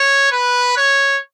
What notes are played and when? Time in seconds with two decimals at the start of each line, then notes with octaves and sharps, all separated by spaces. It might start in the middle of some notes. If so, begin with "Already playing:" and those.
Already playing: C#5
0.32 B4
0.77 C#5